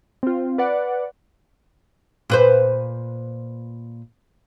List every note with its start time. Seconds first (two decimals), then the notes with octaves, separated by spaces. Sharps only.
0.23 C4 F4
0.58 B4 D5 F#5
2.30 A#2 B4 C5